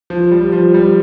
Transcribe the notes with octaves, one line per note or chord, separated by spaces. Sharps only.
F3
G3
F3
G3